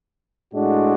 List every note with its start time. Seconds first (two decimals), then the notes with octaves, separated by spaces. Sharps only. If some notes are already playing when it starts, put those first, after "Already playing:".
0.52 A2 G#3 D4 F#4